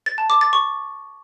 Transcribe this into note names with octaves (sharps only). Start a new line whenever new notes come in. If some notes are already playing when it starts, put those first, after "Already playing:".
A6
A5
D6
A6
C#6